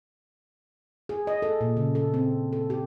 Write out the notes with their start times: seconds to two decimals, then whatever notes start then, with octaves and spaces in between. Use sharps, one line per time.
1.09 G#4
1.27 D#5
1.42 A4
1.61 A#2
1.77 C#3
1.95 A4
2.14 C4
2.53 A4
2.70 G4